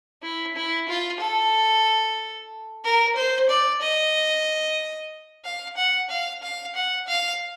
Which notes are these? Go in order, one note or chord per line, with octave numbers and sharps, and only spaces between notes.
E4
E4
F4
A4
A#4
C5
D5
D#5
F5
F#5
F5
F5
F#5
F5